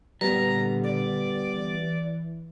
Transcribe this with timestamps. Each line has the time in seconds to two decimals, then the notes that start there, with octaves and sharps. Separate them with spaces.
0.21 A#2 D3 G3 B3 B4 A#5
0.83 D5
1.54 E3